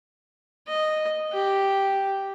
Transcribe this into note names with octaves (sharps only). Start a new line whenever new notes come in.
D#5
G4